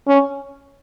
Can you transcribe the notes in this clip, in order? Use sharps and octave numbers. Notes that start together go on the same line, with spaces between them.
C#4